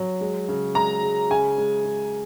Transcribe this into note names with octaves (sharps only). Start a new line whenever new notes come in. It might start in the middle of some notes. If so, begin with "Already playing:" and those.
Already playing: F#3
G#3
C#3
G#3 A#5
G#3
C#3 G#5
G#3
G#3